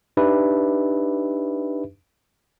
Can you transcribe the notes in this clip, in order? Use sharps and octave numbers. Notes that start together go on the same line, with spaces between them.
D4 D#4 G4 B4 E5